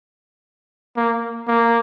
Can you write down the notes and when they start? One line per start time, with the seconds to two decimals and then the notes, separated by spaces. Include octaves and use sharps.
0.96 A#3
1.47 A#3